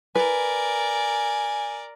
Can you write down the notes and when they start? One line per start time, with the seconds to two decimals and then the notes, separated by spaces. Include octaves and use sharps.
0.15 A#4 B4 D5 G#5